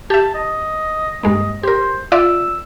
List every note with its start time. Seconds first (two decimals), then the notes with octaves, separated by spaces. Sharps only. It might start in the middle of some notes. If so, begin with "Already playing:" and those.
0.10 G4 E5 A5
0.35 D#5
1.23 G2 G#3 A#3 D#5
1.63 G4 A#4 C5
2.12 F4 D5 E5 E6